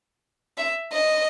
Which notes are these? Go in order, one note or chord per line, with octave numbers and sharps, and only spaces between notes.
E5
D#5